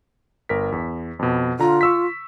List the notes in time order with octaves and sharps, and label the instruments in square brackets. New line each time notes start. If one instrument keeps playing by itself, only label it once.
[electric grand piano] G1 A#4 B6
E2
F2 B2
[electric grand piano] D3 A#5 [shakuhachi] F4
[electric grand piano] C#6 E6 B6